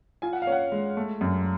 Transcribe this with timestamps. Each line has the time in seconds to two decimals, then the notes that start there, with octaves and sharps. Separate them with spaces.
0.22 F4 G#5
0.33 F#5
0.42 F5
0.47 C#4 F#5
0.72 G#3
0.97 A3
1.21 F#2